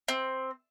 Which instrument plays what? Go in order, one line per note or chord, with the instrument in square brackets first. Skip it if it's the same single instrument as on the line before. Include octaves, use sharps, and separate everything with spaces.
[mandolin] C4